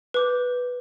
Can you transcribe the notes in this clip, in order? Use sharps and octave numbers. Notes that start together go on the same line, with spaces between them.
B4 D6 G6